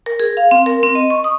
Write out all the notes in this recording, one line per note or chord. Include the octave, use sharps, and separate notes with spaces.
A#4
G#4
F5
C4
A#4
C4
D#5
C#6
D#6